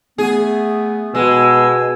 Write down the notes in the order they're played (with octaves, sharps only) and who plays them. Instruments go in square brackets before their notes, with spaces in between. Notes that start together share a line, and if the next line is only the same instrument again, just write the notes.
[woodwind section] A3 B3 [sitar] G#4
[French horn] B2 [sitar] G#3 [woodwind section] G#5 E6